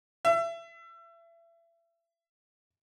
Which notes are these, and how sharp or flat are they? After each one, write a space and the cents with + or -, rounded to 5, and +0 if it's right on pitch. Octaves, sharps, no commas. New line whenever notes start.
E5 +30